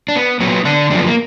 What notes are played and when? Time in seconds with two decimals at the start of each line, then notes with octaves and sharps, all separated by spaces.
0.08 D4
0.16 B3
0.40 A#2 F#3 B3
0.65 D3 D4
0.90 F#2 D3 F3 D4
0.99 B3
1.06 A#3